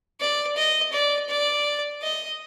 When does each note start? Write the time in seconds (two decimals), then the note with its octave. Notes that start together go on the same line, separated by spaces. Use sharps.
0.21 D5
0.56 D#5
0.93 D5
1.29 D5
2.02 D#5